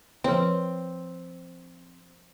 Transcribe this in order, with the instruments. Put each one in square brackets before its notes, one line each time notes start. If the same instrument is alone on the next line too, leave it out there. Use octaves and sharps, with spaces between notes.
[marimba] F3 B4 C#5 [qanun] C4